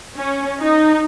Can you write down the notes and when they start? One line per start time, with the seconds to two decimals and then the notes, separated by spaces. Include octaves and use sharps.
0.17 C#4
0.60 D#4